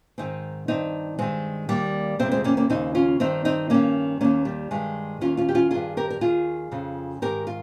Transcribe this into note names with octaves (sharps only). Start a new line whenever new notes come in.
G#2 D#3 C4 D#4
G2 D#3 C4 D#4
G2 D#3 G#3 C4
D#2 D#3 G3 A#3
F2 C3 D#3 G#3 C4
G#3 C4
A#3 C#4
A#3 C#4
D#2 C#3 C4 D#4
C#4 F4
G2 D#3 C4 D#4
C4 D#4
G2 D#3 A#3 C#4
D#2 D#3 A#3 C#4
G3
G2 D#3 G#3
D#2 D#3 C#4 F4
C#4 F4
G4
C#4 F4
G2 D#3 F4 G#4
G4 A#4
A#4
D#2 D#3 F4 G#4
F2 C#3
G#2 D#3 G4 A#4
F4